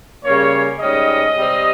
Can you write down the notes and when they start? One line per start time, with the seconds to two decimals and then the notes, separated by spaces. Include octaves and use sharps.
0.24 C#3 G3 A#3 C#4 C#5
0.80 G#2 G3 C#4 D#5
1.35 C3 G3 C4